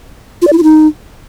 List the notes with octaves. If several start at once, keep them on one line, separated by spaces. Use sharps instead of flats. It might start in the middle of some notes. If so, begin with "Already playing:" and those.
F4
D5
E4
F4
D#4